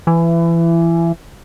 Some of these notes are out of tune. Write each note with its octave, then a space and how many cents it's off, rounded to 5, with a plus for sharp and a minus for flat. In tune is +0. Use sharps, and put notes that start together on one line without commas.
E3 +25